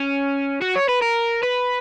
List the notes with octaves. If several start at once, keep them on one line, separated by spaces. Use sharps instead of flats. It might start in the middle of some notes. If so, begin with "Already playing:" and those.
Already playing: C#4
F#4
C#5
B4
A#4
B4